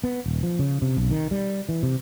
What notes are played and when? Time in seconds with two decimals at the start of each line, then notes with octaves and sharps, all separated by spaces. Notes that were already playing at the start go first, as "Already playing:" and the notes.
0.04 B3
0.26 D#1
0.43 F3
0.59 C#3
0.82 C3
0.97 B1
1.11 D#3
1.31 G3
1.69 E3
1.83 C3